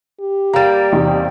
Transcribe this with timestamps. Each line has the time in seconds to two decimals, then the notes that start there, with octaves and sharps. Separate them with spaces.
0.20 G4
0.54 G3 A#3 A#5
0.92 E2 C3 D#4